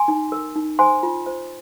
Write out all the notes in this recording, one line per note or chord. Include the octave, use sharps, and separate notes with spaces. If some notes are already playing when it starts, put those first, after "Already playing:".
Already playing: G#5 C6
D#4
A#4
D#4
C5 G#5 C6
F4
C5